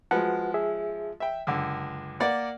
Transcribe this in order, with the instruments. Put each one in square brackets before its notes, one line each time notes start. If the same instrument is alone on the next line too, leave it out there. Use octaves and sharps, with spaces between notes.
[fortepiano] F3 G#3 [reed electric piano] F#4 B4 F#5
[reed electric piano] G#4 E5
[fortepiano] E5 G5
[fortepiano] C#2 D3 [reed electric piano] F#2
[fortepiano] A#3 D5 F#5